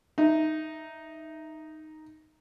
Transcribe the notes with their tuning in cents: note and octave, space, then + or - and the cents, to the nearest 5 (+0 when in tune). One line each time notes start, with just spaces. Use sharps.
D#4 +0 E5 +0